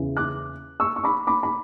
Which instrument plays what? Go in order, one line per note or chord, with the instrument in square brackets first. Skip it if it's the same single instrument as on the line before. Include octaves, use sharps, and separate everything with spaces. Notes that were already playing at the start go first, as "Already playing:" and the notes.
Already playing: [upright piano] E2 C#3 E3
D6 F#6
C#6 E6
C#6
B5 D6
B5 D6
B5